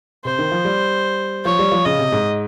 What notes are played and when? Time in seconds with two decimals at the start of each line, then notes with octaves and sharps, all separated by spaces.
0.25 C3 C5
0.39 D#3
0.51 F3
0.65 G3
1.45 F3 C#5
1.59 G3
1.72 F3
1.85 C#3 D#5
1.99 C3
2.12 G#2